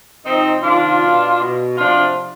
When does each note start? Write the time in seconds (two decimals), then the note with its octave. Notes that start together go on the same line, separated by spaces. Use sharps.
0.25 C3 F3 C4 D#4
0.63 C3 D#3 D4 F4
1.02 B2
1.40 B2
1.77 C3 F3 D4 F4